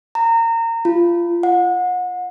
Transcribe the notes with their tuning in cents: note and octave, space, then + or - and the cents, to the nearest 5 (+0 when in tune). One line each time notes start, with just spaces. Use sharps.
A#5 -25
F4 -25
F#5 -30